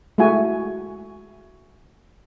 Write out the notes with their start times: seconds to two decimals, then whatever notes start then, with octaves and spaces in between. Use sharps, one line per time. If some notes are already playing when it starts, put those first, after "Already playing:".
0.18 G#3 A3 E4 F#4 G#5